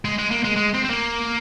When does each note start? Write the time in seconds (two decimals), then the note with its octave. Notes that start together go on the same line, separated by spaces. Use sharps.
0.05 G#3
0.18 G#3
0.31 A#3
0.44 G#3
0.56 G#3
0.74 C4
0.84 C4
0.90 A#3